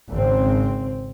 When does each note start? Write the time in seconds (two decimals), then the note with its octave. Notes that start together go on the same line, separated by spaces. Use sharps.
0.10 G#1 C#3 C4